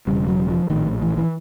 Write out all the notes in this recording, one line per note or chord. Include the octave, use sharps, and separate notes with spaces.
E1 D#2 C#3 G3
F#3
F3
A#1 A2 D#3
E3
E3